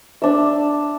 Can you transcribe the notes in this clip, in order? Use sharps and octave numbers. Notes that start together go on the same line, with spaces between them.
D4 E5